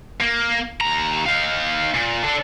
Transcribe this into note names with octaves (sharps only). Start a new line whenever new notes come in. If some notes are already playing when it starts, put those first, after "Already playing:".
A#3
D#2 A#5
D#4 F5
A#2
D4 A4